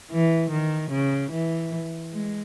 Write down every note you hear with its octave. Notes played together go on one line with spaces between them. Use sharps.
E3
D#3
C#3
E3
G#3